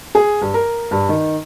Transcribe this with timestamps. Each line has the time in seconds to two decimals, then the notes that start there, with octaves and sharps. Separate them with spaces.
0.15 G#4
0.41 G2
0.54 A#4
0.91 G2
1.09 D#3